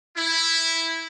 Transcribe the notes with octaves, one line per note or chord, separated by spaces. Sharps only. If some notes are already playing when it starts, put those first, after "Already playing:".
E4